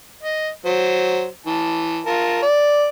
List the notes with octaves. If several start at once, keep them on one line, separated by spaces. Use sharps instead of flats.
D#5
F#3 C5
E3 A5
F4 A#4 A5
D5